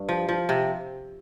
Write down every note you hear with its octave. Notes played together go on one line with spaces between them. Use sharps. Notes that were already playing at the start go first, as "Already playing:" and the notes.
Already playing: G2
F3
F3
C3